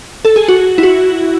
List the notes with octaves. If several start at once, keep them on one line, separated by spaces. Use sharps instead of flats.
A4
G#4
F#4
E4
F#4